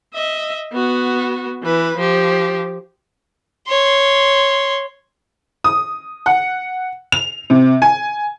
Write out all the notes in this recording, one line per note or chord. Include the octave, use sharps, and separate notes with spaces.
D#5 E5
B3 F#4
E3 B4
F3 G4
C#5 C6
D#6
F#5
F7
C3
G#5